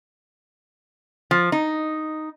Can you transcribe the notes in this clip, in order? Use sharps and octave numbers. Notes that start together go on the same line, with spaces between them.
F3
D#4